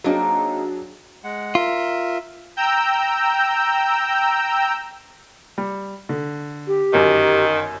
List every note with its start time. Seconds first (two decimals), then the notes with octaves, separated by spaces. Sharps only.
0.04 F#3 A#3 C4 D4 D#4 G#4
1.24 G#3 F#5
1.55 F4 A#4 E5
2.57 G5 A#5 E6 G6
5.58 G3
6.09 D3
6.68 G4
6.93 G1 F#2 D#3